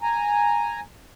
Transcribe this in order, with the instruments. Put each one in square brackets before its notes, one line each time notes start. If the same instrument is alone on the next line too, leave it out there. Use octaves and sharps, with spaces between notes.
[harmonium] G#5 A#5